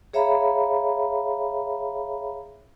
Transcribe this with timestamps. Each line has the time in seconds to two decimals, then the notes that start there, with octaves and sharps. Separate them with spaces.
0.13 G#4 C#5 E5 F5 A#5 B5